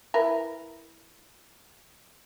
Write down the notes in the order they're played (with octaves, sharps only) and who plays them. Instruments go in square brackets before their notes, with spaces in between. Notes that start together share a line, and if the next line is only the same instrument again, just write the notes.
[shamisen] E4 A#4 B4